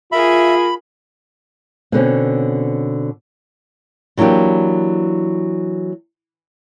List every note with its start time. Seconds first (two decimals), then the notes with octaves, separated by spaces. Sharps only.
0.12 F4 G#4 A#4 E5 B5
1.92 B2 D3 C4 C#4
4.17 E3 F#3 A#3 D4 G4